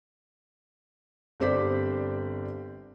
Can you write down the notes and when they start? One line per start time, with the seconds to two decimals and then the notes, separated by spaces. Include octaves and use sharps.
1.40 G1 C4 G4 C5 D5 B6